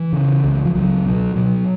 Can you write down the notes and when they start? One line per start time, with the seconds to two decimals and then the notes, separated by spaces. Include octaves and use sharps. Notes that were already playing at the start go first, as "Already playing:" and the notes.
Already playing: E3
0.13 C#3
0.44 C#2
0.65 F3
0.75 C#2 F#3
1.06 B2
1.36 B2 F#3